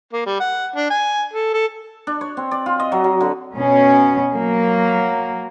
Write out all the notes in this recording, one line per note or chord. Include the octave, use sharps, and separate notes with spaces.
A#3
G3
F#5
D4
G#5
A4
A4
D4
C#5
C4
D5
F4
D#5
F#3
F#3
D3
B2 C#4
F#3 A#3